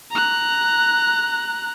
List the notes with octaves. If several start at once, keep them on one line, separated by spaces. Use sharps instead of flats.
A#5 F#6